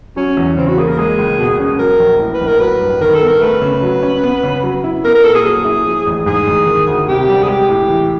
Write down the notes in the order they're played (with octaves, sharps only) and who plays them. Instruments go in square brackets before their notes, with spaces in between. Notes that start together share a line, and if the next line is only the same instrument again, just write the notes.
[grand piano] F#3 [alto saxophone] C#4
[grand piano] E2
[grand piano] C#3 [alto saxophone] C4
[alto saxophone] F#4
[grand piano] A#3 [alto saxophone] G#4
[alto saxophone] A#4
[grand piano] G#3 [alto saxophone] G#4
[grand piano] C#2
B2
C#4
[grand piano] F#3 [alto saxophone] A#4
[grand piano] A#1
A2
[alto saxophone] B4
[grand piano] A#1
[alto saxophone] A#4
[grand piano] F#3 [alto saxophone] B4
[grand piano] G2
[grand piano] D#3 [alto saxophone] A#4
[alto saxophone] A4
[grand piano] B3
[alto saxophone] A#4
[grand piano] A3 [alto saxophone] B4
[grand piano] C#3
F#3
C#4
B3
C#3
F#3
E4
[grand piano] B3 [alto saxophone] A#4
[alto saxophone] A#4
[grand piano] A#2 [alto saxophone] A4
[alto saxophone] G#4
[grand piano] F#3 [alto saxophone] G#4
[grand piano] E4
F3
A1
[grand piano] G#2 [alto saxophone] G#4
[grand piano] A1
D#3
D2
[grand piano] C3 [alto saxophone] G4
[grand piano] G3
[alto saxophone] G#4
[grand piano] G#3 [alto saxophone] G4
[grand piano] A2
E3